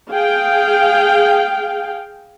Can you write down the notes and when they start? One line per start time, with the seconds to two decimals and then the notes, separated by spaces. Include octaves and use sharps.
0.10 G#4 F5 G5